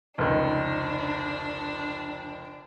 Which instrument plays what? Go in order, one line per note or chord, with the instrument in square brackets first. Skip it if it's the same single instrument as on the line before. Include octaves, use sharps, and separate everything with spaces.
[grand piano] F1 C#2 D#3 [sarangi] D4